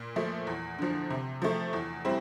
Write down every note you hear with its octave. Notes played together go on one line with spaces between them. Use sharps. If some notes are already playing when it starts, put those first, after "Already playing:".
Already playing: A#2
F3 A3
E2
D3 F3
C3
F3 A3
E2
G3 C4 E4